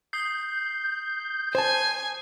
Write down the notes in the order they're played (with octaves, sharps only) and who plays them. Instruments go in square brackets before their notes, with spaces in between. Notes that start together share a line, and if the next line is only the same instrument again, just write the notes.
[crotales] D#6 C7 [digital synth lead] G6
[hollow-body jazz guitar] C5 A5 [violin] G#5